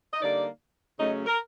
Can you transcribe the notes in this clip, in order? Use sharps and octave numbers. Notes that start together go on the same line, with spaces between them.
D#5
D3 G3 A#3 D#4 D5
C#3 F#3 A3 C#4 D#5
A#4